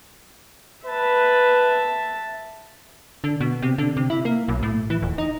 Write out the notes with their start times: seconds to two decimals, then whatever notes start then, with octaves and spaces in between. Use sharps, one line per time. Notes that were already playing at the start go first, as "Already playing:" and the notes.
0.86 B4 E5 A5
3.24 D3
3.40 B2
3.62 C3
3.78 D3
3.97 C3
4.10 E4
4.25 A#3
4.48 B1
4.63 A2
4.90 E3
5.02 D#1
5.18 D#4